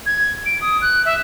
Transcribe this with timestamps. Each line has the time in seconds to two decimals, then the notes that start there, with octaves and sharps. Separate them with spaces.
0.06 G#6
0.46 D7
0.61 D#6
0.82 F#6
1.05 E5